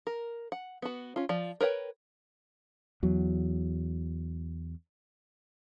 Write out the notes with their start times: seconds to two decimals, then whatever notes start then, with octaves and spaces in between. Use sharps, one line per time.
0.07 A#4
0.52 F#5
0.82 B3 F#4
1.16 C#4 F4
1.29 F3 D5
1.61 A#4 B4 C#5 G5
3.03 E2 F#3